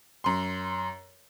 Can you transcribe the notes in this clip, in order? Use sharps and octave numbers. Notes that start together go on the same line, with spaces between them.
F#2 C6